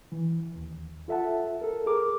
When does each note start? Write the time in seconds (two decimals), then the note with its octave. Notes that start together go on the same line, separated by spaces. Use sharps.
0.12 E3
0.55 D#2
1.08 F4 A4 E5 F#5 A5
1.61 A4 A#4
1.86 G#4 A#4 D6